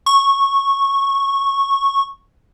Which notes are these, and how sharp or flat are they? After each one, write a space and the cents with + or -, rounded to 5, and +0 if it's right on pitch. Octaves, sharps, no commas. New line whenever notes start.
C#6 -10